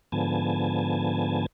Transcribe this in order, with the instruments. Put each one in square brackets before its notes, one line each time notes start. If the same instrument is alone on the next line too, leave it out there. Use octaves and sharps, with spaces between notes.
[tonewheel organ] G#2 D3 F3 B3 G#5 A5